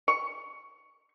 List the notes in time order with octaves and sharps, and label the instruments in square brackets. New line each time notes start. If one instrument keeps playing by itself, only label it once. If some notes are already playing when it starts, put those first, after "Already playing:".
[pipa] C#6